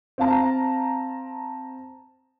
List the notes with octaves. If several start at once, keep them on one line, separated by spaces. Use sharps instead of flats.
C4 F5 A5 A#5